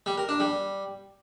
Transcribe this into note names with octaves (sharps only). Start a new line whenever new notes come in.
G3
A#4
D4
G3